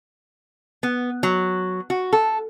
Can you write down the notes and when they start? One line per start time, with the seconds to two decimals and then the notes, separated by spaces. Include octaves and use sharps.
0.83 B3
1.23 F#3
1.90 F#4
2.13 A4